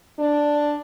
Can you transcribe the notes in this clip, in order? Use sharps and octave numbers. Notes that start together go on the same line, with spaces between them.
D4